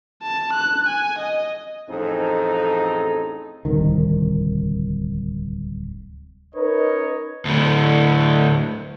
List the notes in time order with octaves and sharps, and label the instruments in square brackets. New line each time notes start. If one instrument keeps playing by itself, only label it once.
[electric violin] A5
F#6
G#5
D#5
[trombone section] A1 F2 C4 D#4 G#4 A4
[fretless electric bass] D1 C2 D#3
[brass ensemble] C#4 D#4 A#4 B4 C#5 D#5
[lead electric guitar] D2 A2